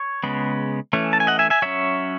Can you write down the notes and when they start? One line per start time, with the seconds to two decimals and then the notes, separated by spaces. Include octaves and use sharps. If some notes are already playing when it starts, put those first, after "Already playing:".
Already playing: C#5
0.24 C#3 G#3 B3
0.93 E3 A3 C#4
1.13 A5
1.20 G#5
1.27 D#5 F#5
1.39 E5 G#5
1.50 E5 G#5
1.62 F#3 C#4 C#5 E5